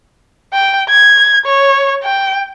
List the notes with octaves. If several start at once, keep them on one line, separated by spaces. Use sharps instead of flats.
G5
G#6
C#5
G5